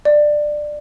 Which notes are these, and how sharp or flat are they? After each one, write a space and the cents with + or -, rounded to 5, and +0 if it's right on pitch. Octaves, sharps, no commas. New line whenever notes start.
D5 +15